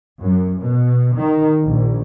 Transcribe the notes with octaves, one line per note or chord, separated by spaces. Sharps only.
F#2
B2
D#3
A#1